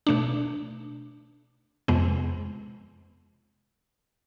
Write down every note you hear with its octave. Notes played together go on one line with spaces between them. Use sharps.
B2 A3 D4
F2 C3 G#3 B3